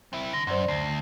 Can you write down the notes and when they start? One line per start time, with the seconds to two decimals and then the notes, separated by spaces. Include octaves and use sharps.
0.13 C4 E4
0.33 D3 A#6
0.47 F#2 C5 D5 C6
0.68 D2 A#6 C7